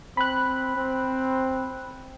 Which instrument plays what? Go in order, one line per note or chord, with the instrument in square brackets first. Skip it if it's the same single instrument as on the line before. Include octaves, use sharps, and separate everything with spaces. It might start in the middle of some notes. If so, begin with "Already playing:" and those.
[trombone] C4 [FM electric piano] B5 F#6
[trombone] C4